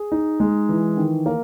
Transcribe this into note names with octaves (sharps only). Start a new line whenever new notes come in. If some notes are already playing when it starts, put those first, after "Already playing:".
Already playing: G#4
D#4
G#3
E3
D#3
A#3